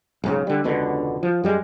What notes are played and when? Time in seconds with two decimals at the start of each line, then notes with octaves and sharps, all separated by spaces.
0.24 B1 G#2 C#3
0.47 D3 G3
0.64 E1 C#2 B2 D3
1.23 F3
1.44 F#2 G3 G#3